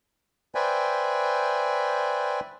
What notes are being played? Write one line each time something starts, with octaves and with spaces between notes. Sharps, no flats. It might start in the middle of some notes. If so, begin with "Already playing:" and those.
B4 C5 D5 E5 G5 G#5